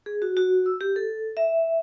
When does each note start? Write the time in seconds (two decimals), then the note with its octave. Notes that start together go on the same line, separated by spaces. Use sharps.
0.06 G#4
0.22 F#4
0.37 F#4
0.66 E6
0.81 G4
0.96 A4
1.37 E5